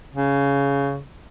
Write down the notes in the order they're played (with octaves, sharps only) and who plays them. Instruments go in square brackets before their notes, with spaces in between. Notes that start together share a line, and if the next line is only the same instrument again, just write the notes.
[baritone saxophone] C#3